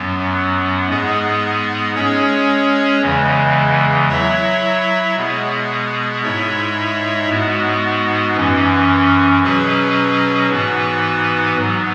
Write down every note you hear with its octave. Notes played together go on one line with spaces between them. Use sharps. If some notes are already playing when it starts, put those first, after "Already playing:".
Already playing: F#2 F#3 B3
G#2 G#3 B3 G#4
G#3 C#4 G#4 C#5
E2 C#3 E3 G#3
F#3 E4 C#5 E5
B2 G#3 B3 G#4
G#2 G#3 E4 C#5 E5
G#2 G#3 B3 F#4
F#2 E3 C#4
B2 F#3 C#4 G#4 B4
G#2 E3 B3 F#4 B4
G#2 F#3 B3